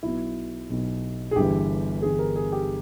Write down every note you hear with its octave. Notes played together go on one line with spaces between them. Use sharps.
B1 B2 E4
B1 B2
G#4
G1 G2 E3 G4
G1 G2 E3 G#4
A#4
G#4
G4